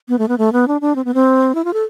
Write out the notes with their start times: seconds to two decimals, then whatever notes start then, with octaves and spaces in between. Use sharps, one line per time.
0.09 B3
0.19 A3
0.28 B3
0.38 A3
0.53 B3
0.68 D4
0.81 D4
0.96 C4
1.05 B3
1.14 C4
1.55 E4
1.65 F4
1.73 A4